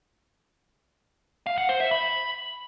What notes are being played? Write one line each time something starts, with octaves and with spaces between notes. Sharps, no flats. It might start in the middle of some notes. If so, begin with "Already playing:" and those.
F5
F#5
C5
E5
B5